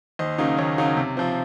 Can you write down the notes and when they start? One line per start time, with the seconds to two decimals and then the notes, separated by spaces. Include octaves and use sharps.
0.19 D#2 C5 D#5
0.38 C#3 F#3 A#3 D#4
0.57 D#2 C#5
0.78 C#3 F#3 A#3 D#4
0.97 C3
1.17 F3 C4